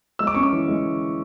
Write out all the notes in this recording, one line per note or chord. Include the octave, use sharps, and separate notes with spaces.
G#3 E6
D6
C#4 C#6
D6
E3
G#3